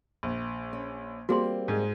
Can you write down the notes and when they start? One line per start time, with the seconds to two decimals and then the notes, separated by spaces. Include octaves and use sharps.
0.23 A#1
0.73 C#4
1.29 G3 A#3 C4 F#4 G#4 C6
1.68 G#2 G#3